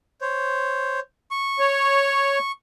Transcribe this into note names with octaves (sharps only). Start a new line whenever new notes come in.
C5 C#5
C#6
C#5